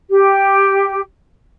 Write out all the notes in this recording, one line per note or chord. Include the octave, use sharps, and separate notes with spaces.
G4